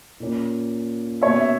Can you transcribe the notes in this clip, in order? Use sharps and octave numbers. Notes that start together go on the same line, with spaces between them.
A#2 A#3 C#4
B2 A#3 C#4 C#5 E5
E5